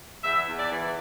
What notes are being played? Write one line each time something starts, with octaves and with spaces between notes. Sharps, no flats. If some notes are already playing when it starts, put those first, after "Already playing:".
E2 E5
E2
D5
E3